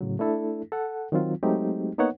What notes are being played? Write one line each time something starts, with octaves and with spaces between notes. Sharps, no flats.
A2 C#3 F#3
A3 D4 E4 A4
A4 F#5
D#3 F#3 C4 F4
F#3 G#3 A3 C4 D#4 G4
A#3 B3 D#4 B4 C#5 F#5